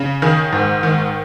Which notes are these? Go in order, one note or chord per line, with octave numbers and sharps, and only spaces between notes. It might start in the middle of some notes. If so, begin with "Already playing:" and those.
Already playing: C#3
D#3 G#4
G#2
D#3